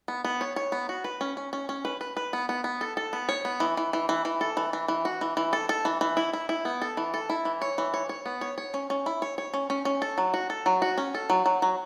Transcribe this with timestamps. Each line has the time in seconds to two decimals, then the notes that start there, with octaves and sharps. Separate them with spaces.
0.08 B3
0.24 B3
0.41 C#5
0.56 C#5
0.72 B3
0.89 F#4
1.04 B4
1.21 C#4
1.37 C#4
1.53 C#4
1.69 C#4
1.85 B4
2.01 B4
2.17 B4
2.33 B3
2.49 B3
2.64 B3
2.81 A4
2.97 A4
3.13 B3
3.29 C#5
3.45 B3
3.60 E3
3.77 E3
3.93 E3
4.09 E3
4.25 E3
4.41 A4
4.57 E3
4.73 E3
4.88 E3
5.05 F#4
5.21 E3
5.37 E3
5.53 A4
5.69 A4
5.85 E3
6.01 E3
6.17 E4
6.33 E4
6.49 E4
6.65 B3
6.82 A4
6.97 E3
7.14 A4
7.29 E4
7.45 E3
7.62 C#5
7.78 E3
7.94 C#5
8.09 C#5
8.26 B3
8.41 C#5
8.58 C#5
8.74 C#4
8.90 C#4
9.06 E4
9.22 C#5
9.38 C#5
9.54 C#4
9.70 C#4
9.85 C#4
10.02 A4
10.18 F#3
10.34 F#4
10.50 A4
10.66 F#3
10.82 F#4
10.98 C#4
11.15 A4
11.30 F#3
11.46 F#3
11.62 F#3